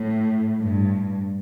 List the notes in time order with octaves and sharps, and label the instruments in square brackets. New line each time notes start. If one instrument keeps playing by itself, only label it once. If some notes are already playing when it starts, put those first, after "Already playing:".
Already playing: [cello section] A2
G2